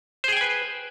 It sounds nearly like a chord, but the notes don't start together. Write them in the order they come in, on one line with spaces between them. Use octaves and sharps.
C5 G#4 G5 G#5 B4